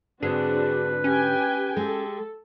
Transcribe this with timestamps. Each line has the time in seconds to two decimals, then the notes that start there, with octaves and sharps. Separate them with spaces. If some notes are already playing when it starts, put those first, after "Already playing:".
0.22 G#2 D3 C4 D4 F#4 G#4 B4
1.04 C#4 G4 G5 G#5
1.77 G#3 G4 A4